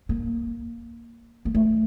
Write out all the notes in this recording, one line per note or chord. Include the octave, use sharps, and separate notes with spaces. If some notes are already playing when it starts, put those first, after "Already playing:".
A#3
A#3
A3